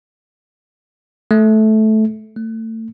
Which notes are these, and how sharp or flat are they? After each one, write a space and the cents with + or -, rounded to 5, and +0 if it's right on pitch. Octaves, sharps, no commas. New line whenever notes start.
A3 -15
A3 +30